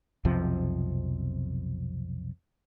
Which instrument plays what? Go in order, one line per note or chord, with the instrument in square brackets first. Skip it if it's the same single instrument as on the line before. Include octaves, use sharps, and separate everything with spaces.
[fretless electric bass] B1 F2 C3 F3